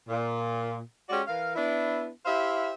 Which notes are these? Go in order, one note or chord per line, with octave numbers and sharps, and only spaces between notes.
A#2
G#3 C#4 F#4 G4 D5
E3 A#4 F5
B3 D4 E4
E4 G4 C5 E5 F5